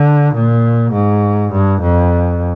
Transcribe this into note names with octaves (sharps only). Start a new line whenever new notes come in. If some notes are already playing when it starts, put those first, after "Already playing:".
Already playing: D3
A#2
G#2
G2
F2